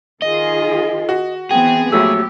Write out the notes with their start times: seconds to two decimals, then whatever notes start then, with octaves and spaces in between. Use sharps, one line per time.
0.22 D#3 F4 G#4 D#5
1.09 F#4
1.51 E3 B3 C4 G#4 G5
1.92 A#1 F#3 A3 G4 E6